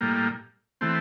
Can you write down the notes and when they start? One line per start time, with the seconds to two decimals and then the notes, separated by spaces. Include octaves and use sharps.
0.01 A2 G3 A#3
0.81 E3 A3 C4